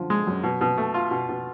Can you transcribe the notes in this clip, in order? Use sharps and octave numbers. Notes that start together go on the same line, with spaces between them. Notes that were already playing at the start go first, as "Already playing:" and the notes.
Already playing: F#2 D3 F3
G#3
F#2
B2
B2
A3
F4
B2
B2